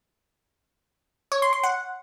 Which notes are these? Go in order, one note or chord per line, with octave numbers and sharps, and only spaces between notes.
C#5
C6
C6
F#5